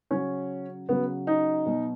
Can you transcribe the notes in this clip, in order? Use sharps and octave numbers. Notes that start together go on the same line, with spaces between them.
C#3 F#3 C#4
C#3 F#3 B3
D#4
B2 F#3